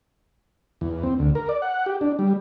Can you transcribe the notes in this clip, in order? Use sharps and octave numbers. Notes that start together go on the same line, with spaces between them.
E2
C4
D2
A#4
D5
F#5
G4
D4
G3